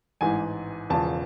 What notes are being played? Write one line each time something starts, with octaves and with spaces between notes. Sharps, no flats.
A1 G#2 E3 G#5
E1 E2 C#3 F3 A5